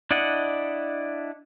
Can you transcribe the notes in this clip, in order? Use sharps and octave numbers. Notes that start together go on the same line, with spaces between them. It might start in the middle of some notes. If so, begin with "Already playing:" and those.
D4 E4 D5 D#5 F#5